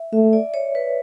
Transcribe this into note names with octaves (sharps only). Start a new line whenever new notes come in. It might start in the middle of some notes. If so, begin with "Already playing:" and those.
Already playing: E5
A3 E5
D5
C#5
B4